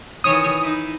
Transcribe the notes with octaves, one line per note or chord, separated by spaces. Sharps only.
D#3 E3 C#5 D#6
D#4 E4